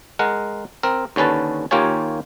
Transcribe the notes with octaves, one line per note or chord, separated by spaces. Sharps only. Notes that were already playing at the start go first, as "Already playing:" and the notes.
G#3 A#4 F#5
C4 A#4
D#2 D3 C#4 B4 A5
D#2 A#3 F4 G4 C#5 G#5